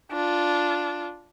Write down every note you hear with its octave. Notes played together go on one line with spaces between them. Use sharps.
D4 F4